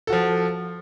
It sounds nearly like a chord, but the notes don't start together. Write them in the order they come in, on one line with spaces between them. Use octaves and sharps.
A4 F#4 F3